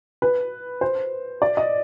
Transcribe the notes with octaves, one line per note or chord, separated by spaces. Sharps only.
B4
C5
D5
D#5